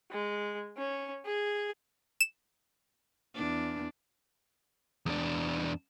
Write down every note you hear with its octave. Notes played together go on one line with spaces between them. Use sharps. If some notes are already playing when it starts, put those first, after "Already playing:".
G#3
C#4
G#4
E7
E2 D4
E2 D4